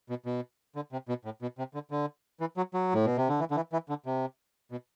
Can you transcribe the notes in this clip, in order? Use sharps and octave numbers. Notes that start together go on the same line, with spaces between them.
B2
B2
D3
C3
B2
A2
B2
C3
D3
D3
E3
F#3
F#3
A2
B2
C3
D3
E3
D3
E3
E3
D3
C3
B2